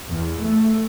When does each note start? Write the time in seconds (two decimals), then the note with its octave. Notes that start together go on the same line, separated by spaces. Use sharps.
0.11 E2
0.43 A3